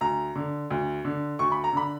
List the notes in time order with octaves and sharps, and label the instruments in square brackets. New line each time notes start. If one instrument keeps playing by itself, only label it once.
[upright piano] D2 A#5
D3
D2
D3
D2 C#6
B5
A#5
D3 B5